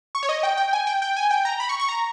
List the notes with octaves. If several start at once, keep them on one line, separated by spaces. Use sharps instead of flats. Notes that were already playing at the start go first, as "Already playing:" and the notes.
C#6
C#5
D#5
G5
G5
G#5
G5
G5
G#5
G5
A#5
B5
C#6
C#6
A#5